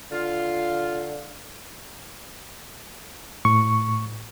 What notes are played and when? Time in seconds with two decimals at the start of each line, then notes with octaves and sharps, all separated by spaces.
0.11 D3 F4
3.45 A2 C#6